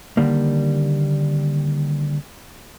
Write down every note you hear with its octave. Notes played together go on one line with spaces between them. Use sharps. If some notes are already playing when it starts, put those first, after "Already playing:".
D3 D#3 G3 A#3